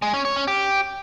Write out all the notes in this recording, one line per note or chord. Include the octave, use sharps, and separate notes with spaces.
G#3
C#4
C#5
C#4
G4